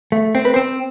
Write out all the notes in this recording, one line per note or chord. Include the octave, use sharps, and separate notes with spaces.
A3
C4 C5
B4
C4 C5